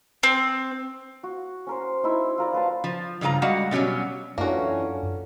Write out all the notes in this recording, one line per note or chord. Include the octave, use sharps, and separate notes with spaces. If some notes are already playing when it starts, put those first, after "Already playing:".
C4
F#4
C#4 A#4 C5
D#4 E4 E5
F4 A#4 D5
F#3 B4 F5 A5
F3
G2 C#3 F4 G#4 A#5
G3 G#3 F#4 F5 F#5
B2 D#3 F#3 G3 C#4
F#2 E3 A#3 C#4 D4 F4 F#4 A4